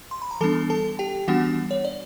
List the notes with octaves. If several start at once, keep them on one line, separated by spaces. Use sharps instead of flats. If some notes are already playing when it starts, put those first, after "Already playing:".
C6
B5
A#5
E3 G3 B3 D4 A4 A5
A4 A5
G4 G5
E3 G3 B3 D4 F#4 F#5
C#5
D5